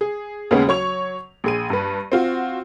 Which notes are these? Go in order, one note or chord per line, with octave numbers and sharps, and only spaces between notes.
G#4
D#2 C#3 G#3 B3 C#4
F#3 C#5 C#6 F7
A#1 G#4 D#7
G2 B4
C4 F4 F#4